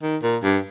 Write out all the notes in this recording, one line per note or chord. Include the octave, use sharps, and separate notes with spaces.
D#3
A#2
G2